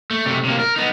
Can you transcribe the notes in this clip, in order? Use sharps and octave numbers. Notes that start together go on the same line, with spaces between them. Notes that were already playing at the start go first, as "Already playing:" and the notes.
A3
C3 A3
C3 A#3
A#4
B3 D#4